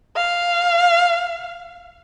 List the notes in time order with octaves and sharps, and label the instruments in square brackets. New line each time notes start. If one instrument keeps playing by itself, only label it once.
[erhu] F5